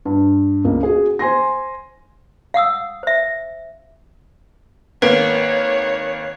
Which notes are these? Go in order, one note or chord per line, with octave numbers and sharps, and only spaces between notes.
G2
C#2 A#3
F#4 G#4
C5 G#5 C6 A#6
F5 F#5 D#6 E6
C5 E5
G#1 A#3 B4 C#5 D7